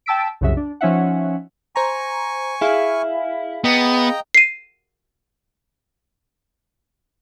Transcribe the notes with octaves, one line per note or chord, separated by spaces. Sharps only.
G5 A5 E6 B6 D7
C2 F#2 C#3 F#3 F#4 E5
D4
F3 C#4 D#4 E5 F#5
C5 G#5 A#5 C#6
E4 G#4 F5
B3 D#5 G5 A#5
C7 D#7